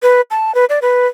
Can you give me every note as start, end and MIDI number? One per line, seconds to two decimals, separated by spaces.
0.03 0.21 71
0.31 0.54 81
0.55 0.65 71
0.70 0.79 74
0.82 1.07 71